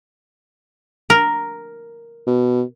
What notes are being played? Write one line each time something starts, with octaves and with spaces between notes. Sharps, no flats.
A#4
B2